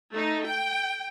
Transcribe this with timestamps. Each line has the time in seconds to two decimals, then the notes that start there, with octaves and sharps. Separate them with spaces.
0.11 A3 D#4
0.45 G5